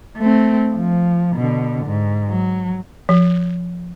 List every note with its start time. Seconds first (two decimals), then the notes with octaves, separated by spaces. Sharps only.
0.18 A3 C4
0.73 F3
1.36 B2 D3
1.86 G#2
2.29 F#3
3.09 F3